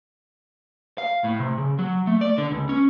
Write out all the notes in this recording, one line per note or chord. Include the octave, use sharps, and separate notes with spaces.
F5
A2
C3
C#3
F#3
A3
D5
D3
C#2
C#4